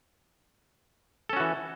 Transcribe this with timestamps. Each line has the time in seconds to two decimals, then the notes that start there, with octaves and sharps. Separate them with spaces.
1.29 A4
1.33 C#4
1.37 F#4
1.40 E3